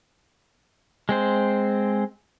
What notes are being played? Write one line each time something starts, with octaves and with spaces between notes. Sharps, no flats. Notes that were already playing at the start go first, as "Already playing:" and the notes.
G#3 C4 C5